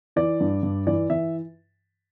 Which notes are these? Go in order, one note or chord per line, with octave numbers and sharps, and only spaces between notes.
E3 D5
G2
G2
E3 D5
E3 E5